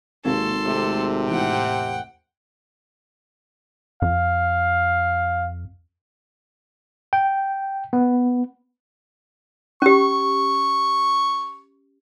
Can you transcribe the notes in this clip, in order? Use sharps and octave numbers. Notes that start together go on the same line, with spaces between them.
G#1 C3 A#3 A4 C#5 C6
C3 G#3 A3
E2 A2 A#3 F#5 G5
F2 F5
G5
B3
C#4 G4 C#6